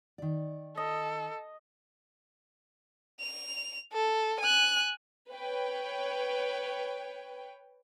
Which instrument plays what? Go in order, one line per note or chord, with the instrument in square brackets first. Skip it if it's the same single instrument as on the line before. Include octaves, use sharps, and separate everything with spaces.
[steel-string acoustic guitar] D#3 D5
[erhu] A4 [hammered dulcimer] D#5
[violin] F7
A4
G#5 F#6
[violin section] B4 C#5 G5